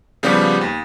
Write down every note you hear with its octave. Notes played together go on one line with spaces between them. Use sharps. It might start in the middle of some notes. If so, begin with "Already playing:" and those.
C#3 F3 G3 B3 G4
D#2